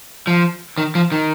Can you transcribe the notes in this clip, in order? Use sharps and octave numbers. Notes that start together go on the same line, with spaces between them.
F3
D#3
F3
D#3